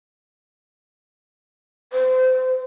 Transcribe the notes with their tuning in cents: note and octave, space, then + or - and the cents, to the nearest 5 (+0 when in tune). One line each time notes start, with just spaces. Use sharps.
C5 -30